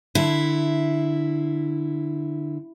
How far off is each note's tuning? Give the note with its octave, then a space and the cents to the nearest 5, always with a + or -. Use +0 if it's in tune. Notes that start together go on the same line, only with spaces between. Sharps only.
D3 +25 E4 +0